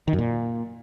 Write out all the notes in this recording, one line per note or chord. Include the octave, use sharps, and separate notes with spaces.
D#3
F#2
A#2